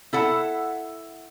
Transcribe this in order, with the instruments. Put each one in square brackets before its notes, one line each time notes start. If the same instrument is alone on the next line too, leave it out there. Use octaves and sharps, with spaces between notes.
[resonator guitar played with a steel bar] E4 A4 F#5